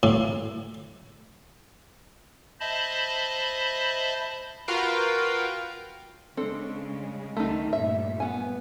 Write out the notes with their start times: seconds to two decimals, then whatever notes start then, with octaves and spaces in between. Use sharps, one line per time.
0.03 A2
2.60 C5 D#5 E5 A5 B5
4.68 F4 F#4 A#4 B4 F5 G5
6.37 C#3 G#3 C4 D4 A4
7.37 D2 D#3 G3 A3 D#4
7.73 G2 A#2 A3 E5
8.20 B3 G#5